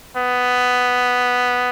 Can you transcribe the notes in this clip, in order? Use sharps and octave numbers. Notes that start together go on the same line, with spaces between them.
B3